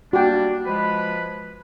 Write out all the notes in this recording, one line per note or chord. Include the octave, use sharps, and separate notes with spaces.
G3 A#3 D4 F#4 G5
F3 G#3 B4